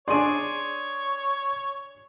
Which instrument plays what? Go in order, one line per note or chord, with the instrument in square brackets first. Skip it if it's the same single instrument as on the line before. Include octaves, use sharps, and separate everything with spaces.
[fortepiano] D4 G#4 D5 [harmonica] C#5 [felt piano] C6 D#7